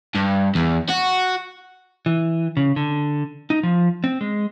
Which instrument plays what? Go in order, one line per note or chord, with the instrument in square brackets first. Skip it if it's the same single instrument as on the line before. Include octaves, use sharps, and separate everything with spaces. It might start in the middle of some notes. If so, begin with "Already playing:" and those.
[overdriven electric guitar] G2
E2
F#4
[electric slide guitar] E3
C#3
D3
D#4
F3
C4
G#3